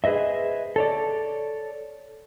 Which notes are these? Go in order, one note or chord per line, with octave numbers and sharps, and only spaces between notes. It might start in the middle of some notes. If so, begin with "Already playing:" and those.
G#4 B4 C5 D#5 E5
A4 C#5 D5